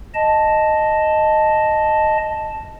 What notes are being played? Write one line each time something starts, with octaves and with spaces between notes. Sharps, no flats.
D#5 A5